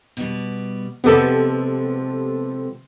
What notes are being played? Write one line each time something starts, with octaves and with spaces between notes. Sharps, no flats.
B2 G3
C3 F3 G#3 B3 G4 A4